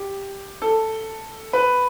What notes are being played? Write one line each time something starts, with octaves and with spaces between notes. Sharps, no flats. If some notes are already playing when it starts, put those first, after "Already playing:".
Already playing: G4
A4
B4